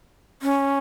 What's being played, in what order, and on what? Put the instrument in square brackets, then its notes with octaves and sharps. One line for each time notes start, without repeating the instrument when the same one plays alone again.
[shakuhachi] C#4